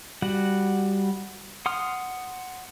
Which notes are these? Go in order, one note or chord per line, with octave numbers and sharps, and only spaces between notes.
G3 F#4 F#5
F#5 C6 D#6 F6